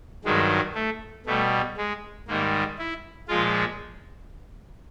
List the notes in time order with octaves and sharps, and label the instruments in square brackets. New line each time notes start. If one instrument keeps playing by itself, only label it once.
[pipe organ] G2 D#3 F#3 G#3
A3
B2 G3 A3
G#3
G#2 D#3 G3 A#3
E4
A#2 F3 G#3 F4